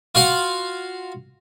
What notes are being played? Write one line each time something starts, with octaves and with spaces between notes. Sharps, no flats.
F4 F#4 F5 F#5